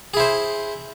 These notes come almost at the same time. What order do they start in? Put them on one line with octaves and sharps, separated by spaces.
G#4 E4 C5